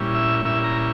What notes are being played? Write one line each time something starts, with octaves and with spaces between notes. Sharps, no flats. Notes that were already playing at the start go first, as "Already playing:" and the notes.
Already playing: A#2 G3 C#4 E4
E5
A#2 G3 C#4 E4 E5
A#5